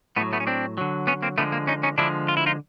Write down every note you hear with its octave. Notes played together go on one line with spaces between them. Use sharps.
A2 F#3 A3 B3
A3 B3
C#4
C4 D4
D3 F#3
B3 C#4
A#3 C4
D3 F3 G#3 A3 B3
A#3
C#4 D#4
C#4 D#4
D3 F3 G#3 D4 E4
F4
E4
D#4 F4